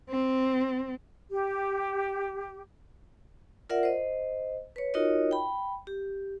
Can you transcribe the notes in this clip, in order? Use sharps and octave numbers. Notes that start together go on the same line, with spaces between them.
C4
G4
F4 A#4 D5 E5 F#5
C5 D#5
B4 C#5
D#4 F4 F#4 A#4 C#5 D#5
G5 B5
G4